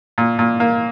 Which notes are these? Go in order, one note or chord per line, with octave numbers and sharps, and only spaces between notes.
A#2
A#2
A#3